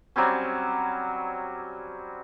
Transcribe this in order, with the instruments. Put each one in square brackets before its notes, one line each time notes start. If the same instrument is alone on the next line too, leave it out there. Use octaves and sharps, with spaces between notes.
[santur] F#3 G3 C4 C#4